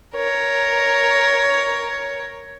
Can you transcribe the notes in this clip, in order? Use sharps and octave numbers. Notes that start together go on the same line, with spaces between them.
A#4 C#5